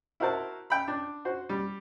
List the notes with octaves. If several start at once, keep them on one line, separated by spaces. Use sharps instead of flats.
E4 F#4 A#4 C5 A5
G5 B5
D4
F#4 C5
G3